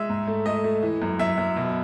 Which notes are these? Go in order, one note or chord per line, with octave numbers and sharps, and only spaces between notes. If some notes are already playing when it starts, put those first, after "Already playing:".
Already playing: G#3 E5
G#2
A3
A3 D#5
A3
E3
F#2
F#2 E5
F#2
B2